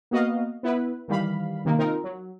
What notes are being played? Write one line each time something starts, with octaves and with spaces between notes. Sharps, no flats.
A#3 B3 F#4 D#5 F5
B3 E4 B4
D#3 E3 G3 F5 B5
C3 D#3 A#3
C4 D#4 F4 A#4
F#3